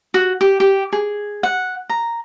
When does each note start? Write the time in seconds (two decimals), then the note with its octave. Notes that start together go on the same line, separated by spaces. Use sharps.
0.14 F#4
0.41 G4
0.60 G4
0.93 G#4
1.43 F#5
1.90 A#5